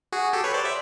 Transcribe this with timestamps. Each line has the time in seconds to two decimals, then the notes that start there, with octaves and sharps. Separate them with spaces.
0.12 F#4 G#4
0.33 G4 A4
0.44 B4 C#5
0.54 C5 D5
0.64 D5 E5